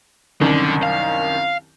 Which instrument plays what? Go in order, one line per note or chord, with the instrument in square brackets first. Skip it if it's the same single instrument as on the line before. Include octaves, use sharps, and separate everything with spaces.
[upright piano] C2 F#2 D#3 [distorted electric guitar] D3
[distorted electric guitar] F5